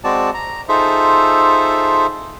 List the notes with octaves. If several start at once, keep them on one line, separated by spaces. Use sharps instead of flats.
G#3 C4 F#4 D5 A5
A#5
D#4 F4 G#4 A4 C5 E5